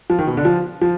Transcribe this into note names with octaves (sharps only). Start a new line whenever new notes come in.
F3
D#3
B2
D3
F3
F3